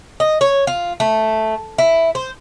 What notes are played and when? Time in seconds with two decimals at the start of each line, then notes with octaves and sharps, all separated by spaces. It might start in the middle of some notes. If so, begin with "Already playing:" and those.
0.20 D#5
0.41 C#5
0.67 F4
1.00 A3
1.78 E4
2.15 C5